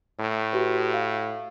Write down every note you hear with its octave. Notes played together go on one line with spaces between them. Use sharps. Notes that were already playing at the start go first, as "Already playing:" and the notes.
A2
F#4 G4 B4
F5